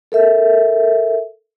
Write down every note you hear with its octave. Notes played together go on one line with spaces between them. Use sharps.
A4 A#4 E5